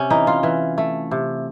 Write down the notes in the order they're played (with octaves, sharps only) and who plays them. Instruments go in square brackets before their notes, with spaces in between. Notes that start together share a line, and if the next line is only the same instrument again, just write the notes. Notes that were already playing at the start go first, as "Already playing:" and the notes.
Already playing: [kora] C3 C#4
E3 D#4
F4
E3
A3
C3